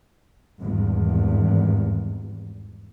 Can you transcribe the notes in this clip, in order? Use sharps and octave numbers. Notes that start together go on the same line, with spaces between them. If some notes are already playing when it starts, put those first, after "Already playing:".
G#1 E2 G2